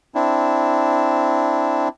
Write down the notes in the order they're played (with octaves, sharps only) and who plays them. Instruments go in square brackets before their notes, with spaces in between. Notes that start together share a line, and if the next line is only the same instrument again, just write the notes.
[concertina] C4 D4 E4